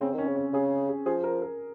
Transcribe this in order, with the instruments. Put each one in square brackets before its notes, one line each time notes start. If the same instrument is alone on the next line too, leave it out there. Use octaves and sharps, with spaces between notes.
[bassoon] C#3 [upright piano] C4
[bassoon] D#3 [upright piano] C#4
[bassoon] C#3
[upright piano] C#4
[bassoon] C#3 [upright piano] G#4
[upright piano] G#4
[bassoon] F3 [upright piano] G#4
[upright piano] A#4
A#4